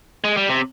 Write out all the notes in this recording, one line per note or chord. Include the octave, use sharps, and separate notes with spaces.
G#3
G3
C3